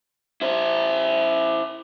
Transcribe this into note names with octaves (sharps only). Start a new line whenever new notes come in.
E4 C5